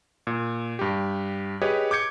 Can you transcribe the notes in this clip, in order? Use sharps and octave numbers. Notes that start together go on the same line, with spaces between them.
A#2
G2 G4
G4 G#4 B4 C#5 D#5
D6 G6 G#6 C#7